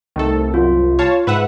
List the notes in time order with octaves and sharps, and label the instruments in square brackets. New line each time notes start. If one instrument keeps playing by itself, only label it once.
[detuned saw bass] C2 [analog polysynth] D#3 A3 A4
[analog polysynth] F#2 [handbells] F4
[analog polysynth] C#5 F5 A5
[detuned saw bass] G#2 [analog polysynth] B4 E5 F#5